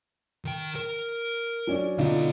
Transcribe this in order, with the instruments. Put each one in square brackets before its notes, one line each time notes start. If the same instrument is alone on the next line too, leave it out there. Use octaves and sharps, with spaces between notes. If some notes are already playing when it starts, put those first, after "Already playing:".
[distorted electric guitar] D#3 G5
A#4
[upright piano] F#3 C#4 D4
[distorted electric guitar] B1 B3 [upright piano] D3 D#4 F4